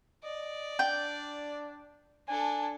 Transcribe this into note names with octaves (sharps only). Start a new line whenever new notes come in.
D5 D#5
D4 G5
D4 A4 G#5